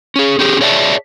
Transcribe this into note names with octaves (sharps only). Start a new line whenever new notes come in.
C#4 G#4
C#4 G4 G#4
G#4 C#5 D5 E5 G#5 A5